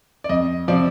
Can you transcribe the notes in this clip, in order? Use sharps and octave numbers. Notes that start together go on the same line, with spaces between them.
D5
F2 D#5
C3 F3 D5